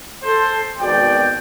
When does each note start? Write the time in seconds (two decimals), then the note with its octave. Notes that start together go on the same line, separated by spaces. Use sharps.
0.23 A4 C5
0.78 G#1 B2 D5 G5